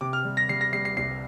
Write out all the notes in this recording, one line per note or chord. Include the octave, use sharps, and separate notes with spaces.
C3 D6
F6
G3
A#6
G3 C7
A#6
G3 C7
C7
C2 C7